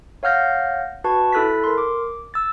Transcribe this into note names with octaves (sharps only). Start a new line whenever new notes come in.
C#5 F5 F#5 F6 G6 A#6
F#4 B4 A5 C#6
E4 A4 F#6 A6 B6
A#4 C6
D6
E6 A6